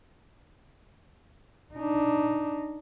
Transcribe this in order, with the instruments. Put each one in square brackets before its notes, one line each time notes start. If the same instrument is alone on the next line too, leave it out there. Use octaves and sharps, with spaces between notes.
[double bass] D4 D#4